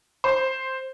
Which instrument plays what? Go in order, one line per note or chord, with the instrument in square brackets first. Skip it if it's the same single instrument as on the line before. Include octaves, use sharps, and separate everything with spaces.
[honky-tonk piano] C5